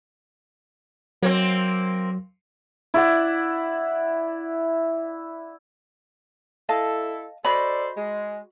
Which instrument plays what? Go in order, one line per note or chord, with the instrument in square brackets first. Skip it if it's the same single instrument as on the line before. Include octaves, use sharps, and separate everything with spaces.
[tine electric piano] F#3 [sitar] A#3 C4
[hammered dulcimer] E4 D5 F#5
[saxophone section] E4 A4 [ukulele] D#5 F5 A5
[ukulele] F#4 D#5 B5 [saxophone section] A4 C5 D5
[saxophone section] G#3